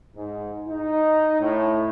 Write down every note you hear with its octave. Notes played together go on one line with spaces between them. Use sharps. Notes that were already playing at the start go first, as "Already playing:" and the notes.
G#2
D#4
A2